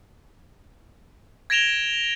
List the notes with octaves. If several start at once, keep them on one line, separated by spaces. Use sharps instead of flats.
G#6 A#6 D7 E7 F7 G7